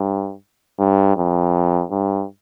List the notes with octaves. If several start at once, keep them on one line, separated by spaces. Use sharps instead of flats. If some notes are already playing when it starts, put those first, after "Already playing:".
Already playing: G2
G2
F2
G2